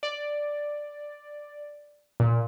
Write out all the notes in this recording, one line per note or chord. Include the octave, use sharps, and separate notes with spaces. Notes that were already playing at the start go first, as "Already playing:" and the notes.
D5
A#2